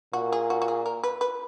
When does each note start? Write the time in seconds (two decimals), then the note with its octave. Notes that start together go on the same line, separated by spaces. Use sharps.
0.13 A#2 F#4
0.32 G#4
0.50 F#4
0.62 F#4
0.68 G#4
0.86 A#4
1.03 B4
1.21 B4